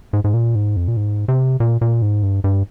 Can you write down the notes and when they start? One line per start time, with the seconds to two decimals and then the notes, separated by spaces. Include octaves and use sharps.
0.13 G#2
0.24 G#2
0.34 A#2
0.55 G#2
0.76 F2
0.88 A#2
0.97 G#2
1.28 C3
1.60 A#2
1.81 A#2
2.02 G#2
2.23 G2
2.44 G2